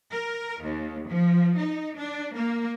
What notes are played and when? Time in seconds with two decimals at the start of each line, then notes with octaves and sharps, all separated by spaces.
0.12 A#4
0.63 D#2
1.08 F3
1.58 D#4
1.98 D4
2.36 A#3